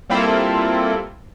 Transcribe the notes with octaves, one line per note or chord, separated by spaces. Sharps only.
G3 A#3 C4 E4 F4 A4